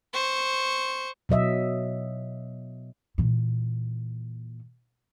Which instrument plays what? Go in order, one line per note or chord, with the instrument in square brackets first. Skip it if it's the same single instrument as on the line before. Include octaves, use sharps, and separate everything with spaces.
[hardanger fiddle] C5 C#6
[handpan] B2 F#3 D#5 E5
[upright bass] A#2 E3